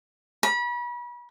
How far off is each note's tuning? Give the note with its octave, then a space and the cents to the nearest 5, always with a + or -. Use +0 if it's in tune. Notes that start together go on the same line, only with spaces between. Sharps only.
B5 -35